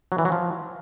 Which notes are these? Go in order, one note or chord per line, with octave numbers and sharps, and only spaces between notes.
F#3
E3
F#3
F3